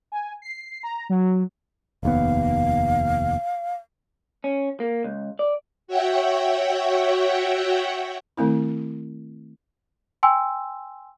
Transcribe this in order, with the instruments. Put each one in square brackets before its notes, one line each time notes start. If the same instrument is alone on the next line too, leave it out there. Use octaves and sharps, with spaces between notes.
[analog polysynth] G#5
C7
A#5
F#3
[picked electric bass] F1 D#2 B3 [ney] F5
[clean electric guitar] C#4
A#3
C#2
D5
[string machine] F#4 C#5 E5 F#5 G5
[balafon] D#3 A3 C4 E4
[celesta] G5 G#5 C6 E6